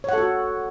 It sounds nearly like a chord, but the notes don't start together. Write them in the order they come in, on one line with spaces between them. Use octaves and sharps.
C#5 F#5 A4 F#4